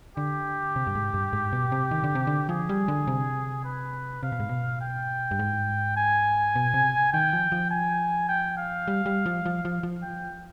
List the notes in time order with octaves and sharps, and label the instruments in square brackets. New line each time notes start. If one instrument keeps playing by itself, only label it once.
[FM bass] D3 [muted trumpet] G4
[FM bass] C3
G2
G#2
G2
G#2
B2
C3
D#3
D3
C3
D3
[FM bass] F3 [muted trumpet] G#4
[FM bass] G3
D3
C3
[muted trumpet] B4
[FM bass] C3 [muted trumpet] F5
[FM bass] B2
G#2
B2
[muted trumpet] G5
[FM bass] G2
G#2
[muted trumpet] G#5
[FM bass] B2
C3
[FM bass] D#3 [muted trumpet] G5
[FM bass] F3
F3
[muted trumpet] G#5
G5
F5
[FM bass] G3
G3
F3
F3
F3
F3
[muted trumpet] G5